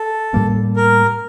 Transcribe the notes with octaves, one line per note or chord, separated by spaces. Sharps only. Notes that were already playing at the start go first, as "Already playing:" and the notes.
Already playing: A4
A2 G3 A#3 C#4
A#4